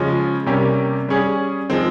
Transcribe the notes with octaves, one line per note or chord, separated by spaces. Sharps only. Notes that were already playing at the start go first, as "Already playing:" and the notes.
Already playing: C#3 F3 G#3 C#4 F4
C3 G3 A#3 C#4 G4
G3 C#4 G#4
F3 G#3 C4